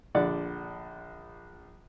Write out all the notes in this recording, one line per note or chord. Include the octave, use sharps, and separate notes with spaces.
A#1 D3 D5 F#5